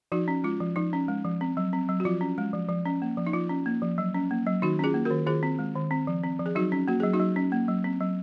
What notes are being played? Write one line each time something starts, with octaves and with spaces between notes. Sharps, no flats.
F3 D#4 F#4
C#4
G#3 F4
F3
F3 D#4
C#4
G#3
F3
C4
F#3
C4
F#3
F#4
F3 F4
C#4
G#3
F3
F3
C#4
A#3
F3
D#4
F3 F4
C#4
A#3
F3
F#3
C#4
A#3
F#3
D#3 D#4 F#4
C#4 F4 G#4
A#3
D#3 F#4 A#4
D#3 F4 G#4
C4
G#3
D#3
C4
F3
C4
F3
G#4
F#3 D#4 F#4
C#4
A#3 F#4
F#3 G#4
D#4 F#4
F#3
C#4
A#3
F#3
C4
F#3